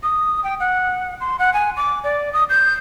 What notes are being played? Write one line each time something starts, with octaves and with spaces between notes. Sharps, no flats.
D#6
G5
F#5
C6
F#5
G#5
D6
D5
D#6
G6